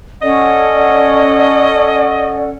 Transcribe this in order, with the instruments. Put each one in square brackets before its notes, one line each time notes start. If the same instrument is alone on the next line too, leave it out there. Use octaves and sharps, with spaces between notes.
[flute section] C#4 A4 F#5 [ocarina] D5 [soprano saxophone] D#5